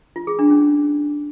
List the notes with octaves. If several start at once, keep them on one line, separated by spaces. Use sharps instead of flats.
F4
G#4
D4
C#4